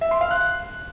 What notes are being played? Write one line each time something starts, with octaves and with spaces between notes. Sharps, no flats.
E5
C6
F5
F#6